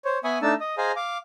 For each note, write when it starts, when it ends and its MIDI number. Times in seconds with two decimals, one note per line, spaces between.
0.05 0.18 72
0.05 0.18 73
0.24 0.38 59
0.24 0.38 76
0.24 0.38 80
0.24 0.38 83
0.24 0.38 85
0.24 0.38 87
0.42 0.54 57
0.42 0.54 62
0.42 0.54 63
0.42 0.54 81
0.42 0.54 88
0.60 0.75 75
0.60 0.75 87
0.78 0.92 68
0.78 0.92 72
0.78 0.92 75
0.78 0.92 77
0.78 0.92 80
0.78 0.92 82
0.96 1.18 77
0.96 1.18 86